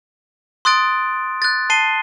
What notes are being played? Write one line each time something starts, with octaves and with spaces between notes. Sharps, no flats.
C6 D#6 F#6 A6 D7
F#6 A6
A5 C7 D#7 G7